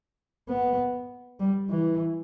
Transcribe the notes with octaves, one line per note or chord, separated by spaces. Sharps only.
B3
G3
E3